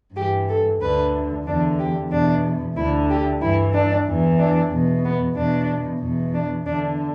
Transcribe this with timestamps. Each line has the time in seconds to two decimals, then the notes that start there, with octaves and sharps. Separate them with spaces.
0.15 G2 E3 G4
0.48 A4
0.80 D2 D3 B4
1.45 E2 D3 D4
1.78 G4
2.11 E2 B2 D4
2.75 D2 D3 E4
3.09 G4
3.41 G2 E3 E4
3.73 D4
4.06 E2 E3
4.38 D4
4.70 E2 B2
5.03 B3
5.36 E2 B2 D4
6.01 E2 B2
6.33 D4
6.66 E2 D3 D4